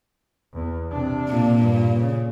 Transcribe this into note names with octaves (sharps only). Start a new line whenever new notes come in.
E2
C3 D4
A#2
G2
C#3